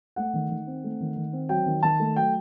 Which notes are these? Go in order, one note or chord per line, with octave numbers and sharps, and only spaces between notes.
A3 F#5
D#3
D#3
C4
A3
D#3
D#3
C4
F#3 G5
D#3
D#3 A5
A3
F#3 G5